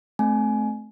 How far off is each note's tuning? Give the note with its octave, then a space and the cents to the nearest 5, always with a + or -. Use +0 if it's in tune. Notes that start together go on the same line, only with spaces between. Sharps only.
A3 -20 C4 +0 G#5 +20